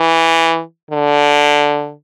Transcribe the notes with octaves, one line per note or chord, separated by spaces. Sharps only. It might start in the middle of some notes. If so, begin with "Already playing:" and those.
Already playing: E3
D3